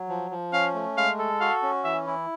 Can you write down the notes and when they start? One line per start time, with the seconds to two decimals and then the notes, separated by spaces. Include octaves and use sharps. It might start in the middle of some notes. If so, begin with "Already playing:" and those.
Already playing: F#3
0.09 F3
0.31 F3
0.53 C#4 F5
0.75 A3
0.97 G#3 F5
1.19 A4
1.41 F#4 F5
1.63 C#4
1.84 E3 E5
2.07 E4